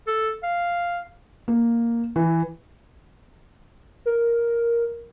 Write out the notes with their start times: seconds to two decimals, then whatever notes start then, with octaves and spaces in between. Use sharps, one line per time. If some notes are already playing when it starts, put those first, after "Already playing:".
0.07 A4
0.43 F5
1.48 A#3
2.16 E3
4.06 A#4